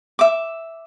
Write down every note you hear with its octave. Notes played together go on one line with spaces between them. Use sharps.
E5 D6